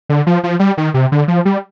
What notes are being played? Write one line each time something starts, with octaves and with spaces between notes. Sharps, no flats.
D3
F3
F3
G3
D#3
C3
D3
F3
G3